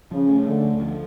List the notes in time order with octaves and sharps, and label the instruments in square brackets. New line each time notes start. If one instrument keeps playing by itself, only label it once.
[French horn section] C#3 [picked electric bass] F3
[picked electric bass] A3
[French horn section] D3 [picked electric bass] A3
[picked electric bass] D2
F3